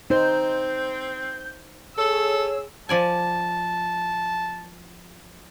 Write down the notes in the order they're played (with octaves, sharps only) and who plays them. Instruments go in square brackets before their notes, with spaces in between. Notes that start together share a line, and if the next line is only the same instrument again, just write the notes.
[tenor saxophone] C4 [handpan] D#4 C5 [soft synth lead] G6
[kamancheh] G#4 E6 [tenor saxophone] A4 [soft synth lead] C#5
[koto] F3 D5 G#5 [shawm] A5